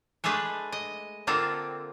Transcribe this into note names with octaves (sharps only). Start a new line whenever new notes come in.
G#3 A3 D4 G#4 B4
D#5
D3 A#3 C4 F4 A4